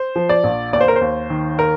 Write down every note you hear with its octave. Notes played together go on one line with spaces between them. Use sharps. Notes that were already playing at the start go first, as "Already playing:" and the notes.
Already playing: C5
F3
D5
A#1
D#2 D5
C5
A#4
C5
D#2
D#3
A#4